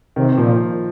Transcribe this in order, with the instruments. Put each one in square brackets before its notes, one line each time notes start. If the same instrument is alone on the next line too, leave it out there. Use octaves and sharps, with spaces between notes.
[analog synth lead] C3 [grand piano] D#3
[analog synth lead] A#2 [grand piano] F3